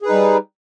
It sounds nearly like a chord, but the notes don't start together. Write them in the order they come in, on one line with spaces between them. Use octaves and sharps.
G#4 B4 D#4 G3